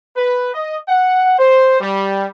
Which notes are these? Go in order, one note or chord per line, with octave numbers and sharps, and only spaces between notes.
B4
D#5
F#5
C5
G3